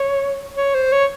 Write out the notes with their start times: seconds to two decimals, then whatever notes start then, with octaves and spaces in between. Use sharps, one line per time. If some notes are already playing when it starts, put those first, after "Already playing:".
Already playing: C#5
0.57 C#5
0.74 C5
0.92 C#5